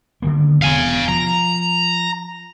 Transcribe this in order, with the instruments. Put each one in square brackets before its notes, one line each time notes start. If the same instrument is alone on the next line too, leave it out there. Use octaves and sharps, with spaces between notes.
[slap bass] D3 D#3 A#3
[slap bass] E1 E2 C3 [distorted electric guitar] F5 G#5
[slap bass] F3 [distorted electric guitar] A#5